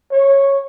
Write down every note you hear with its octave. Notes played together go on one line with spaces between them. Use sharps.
C#5